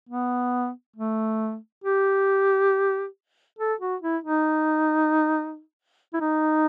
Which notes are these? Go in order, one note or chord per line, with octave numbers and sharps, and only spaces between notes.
B3
A3
G4
A4
F#4
E4
D#4
E4
D#4